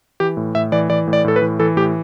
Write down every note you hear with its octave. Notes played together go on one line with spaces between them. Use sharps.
E3 G4
A2
A2 E5
E3 D5
E3 D5
A2
D5
A2 A4
B4
E3
E3 A4
A2 G4